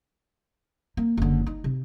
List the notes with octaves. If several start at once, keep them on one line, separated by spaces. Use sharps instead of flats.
A#3
F#1 D3
D#4
C3